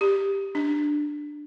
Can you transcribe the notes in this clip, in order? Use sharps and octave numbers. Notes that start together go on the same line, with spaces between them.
G4
D4